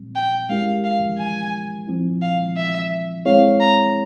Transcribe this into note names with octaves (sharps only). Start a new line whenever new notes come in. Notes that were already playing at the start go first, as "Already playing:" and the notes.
Already playing: A#2 G3 C4
G5
G#3 C#4 E4 G4 A#4 F5
F5
G#5
F3 C4 E4
F5
E5
G#3 C4 E4 G#4 C#5 F5
A#5